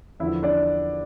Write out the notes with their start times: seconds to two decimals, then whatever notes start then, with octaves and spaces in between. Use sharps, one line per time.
0.20 E2 D3 F3 E4 E5
0.43 D4 D5